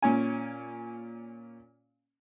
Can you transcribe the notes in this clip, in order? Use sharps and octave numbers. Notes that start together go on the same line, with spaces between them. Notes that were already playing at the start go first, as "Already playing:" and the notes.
A#2 C#4 G#5